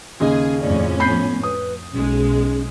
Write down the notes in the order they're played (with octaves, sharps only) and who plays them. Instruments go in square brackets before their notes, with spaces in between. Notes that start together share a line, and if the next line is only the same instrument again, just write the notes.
[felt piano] D#2 C#3 D#5 [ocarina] C#4 [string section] G#4
[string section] F2 A2 C#4 [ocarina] D5
[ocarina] B3 [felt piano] B5 G6 C7
[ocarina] B4 [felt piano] D#6
[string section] B1 G#3 [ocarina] C#4